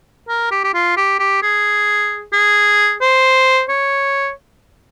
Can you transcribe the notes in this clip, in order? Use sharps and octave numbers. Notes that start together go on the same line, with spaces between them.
A#4
G4
G4
F4
G4
G4
G#4
G#4
C5
C#5